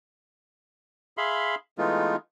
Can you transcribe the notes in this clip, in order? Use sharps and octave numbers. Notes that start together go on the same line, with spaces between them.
G#4 E5 F5 B5 C6
E3 G#3 A3 B3 D#4 F4